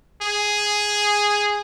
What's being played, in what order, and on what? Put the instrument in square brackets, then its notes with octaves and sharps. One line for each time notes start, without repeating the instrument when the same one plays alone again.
[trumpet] G#4